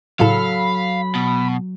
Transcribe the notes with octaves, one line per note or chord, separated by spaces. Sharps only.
A2 C#3 F#3 A4 F5 B5
B2